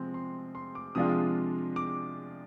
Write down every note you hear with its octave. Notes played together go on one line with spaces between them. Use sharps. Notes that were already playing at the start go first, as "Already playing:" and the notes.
Already playing: C3 F3 G#3 C4 C6
C6
C6
D6
C3 F3 G#3 D4 F4 D#6
D6